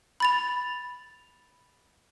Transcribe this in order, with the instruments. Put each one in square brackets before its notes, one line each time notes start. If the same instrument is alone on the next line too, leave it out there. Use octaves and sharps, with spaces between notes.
[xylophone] B5 A6 F7